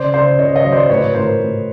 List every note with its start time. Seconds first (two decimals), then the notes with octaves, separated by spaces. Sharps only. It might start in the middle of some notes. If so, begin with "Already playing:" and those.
Already playing: C#3 C5 D5
0.14 C#3 C5 D5
0.39 C#3 C#5 D#5
0.56 C#5 D#5
0.64 F#3
0.72 C5 D5
0.89 A2 B4 C#5
1.15 A2 A#4 C5
1.40 A2